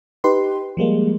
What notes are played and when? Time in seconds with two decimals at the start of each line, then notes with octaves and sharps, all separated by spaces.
0.24 D#4 G4 B4 C6
0.77 F3 G3 G#3 A#3